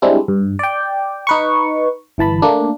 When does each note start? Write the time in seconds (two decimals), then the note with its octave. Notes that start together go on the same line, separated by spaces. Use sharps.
0.02 G3 G#3 C4 D4 E4
0.28 G2
0.59 D5 G5
1.27 D#4 B4 C#6
2.18 G1 E3 A5 B5
2.42 A3 A#3 D4